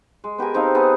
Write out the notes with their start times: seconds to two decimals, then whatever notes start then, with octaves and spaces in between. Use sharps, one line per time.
0.24 G#3
0.38 B3 G4 A#4 G#5
0.54 C4 D#4 A4 F5
0.75 B3 G#4 A4 B4